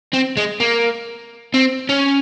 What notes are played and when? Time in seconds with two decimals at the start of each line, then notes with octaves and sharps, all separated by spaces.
0.14 C4
0.37 G#3
0.60 A#3
1.54 C4
1.89 C#4